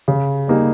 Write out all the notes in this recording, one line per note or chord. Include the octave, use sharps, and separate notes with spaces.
C#3
G3 A#3 D#4 G#4